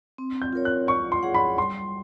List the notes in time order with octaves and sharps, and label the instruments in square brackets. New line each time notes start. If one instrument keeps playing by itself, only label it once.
[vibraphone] C4
[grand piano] G6
[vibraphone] F4 A#4 C#5
[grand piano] F#6
[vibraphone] F4 [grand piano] C#6
[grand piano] C6
[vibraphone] G#4 C#5 F#5
[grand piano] B5
[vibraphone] G3 [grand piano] C6